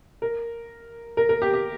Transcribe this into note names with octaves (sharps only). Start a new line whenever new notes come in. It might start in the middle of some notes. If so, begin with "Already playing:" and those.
A#4
A#4
A#4
G4
G4